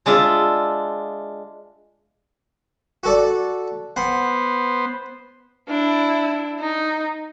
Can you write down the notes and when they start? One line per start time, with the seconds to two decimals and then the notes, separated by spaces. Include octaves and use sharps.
0.06 G#3 D4 F4 E5
3.03 F#4 A4 D5
3.96 B3 C5 F#5
5.68 D4 E4
6.59 D#4